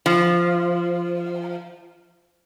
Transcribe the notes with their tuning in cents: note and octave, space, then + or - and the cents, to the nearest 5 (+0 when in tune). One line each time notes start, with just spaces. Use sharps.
F3 -10